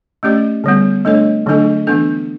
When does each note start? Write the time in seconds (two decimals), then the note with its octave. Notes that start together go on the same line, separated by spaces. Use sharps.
0.23 A3 C#4 G4 D5
0.64 D3 G3 B3
1.05 A3 D4 A4 C#5
1.46 D3 F#3 A3 D4 A4
1.87 E3 B3 D4 A4